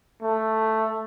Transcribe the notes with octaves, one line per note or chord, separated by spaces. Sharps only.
A3